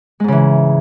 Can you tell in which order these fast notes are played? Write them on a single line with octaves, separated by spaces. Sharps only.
G#3 G#2 C#3 E3